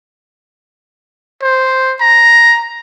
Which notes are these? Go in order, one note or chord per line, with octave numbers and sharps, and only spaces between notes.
C5
A#5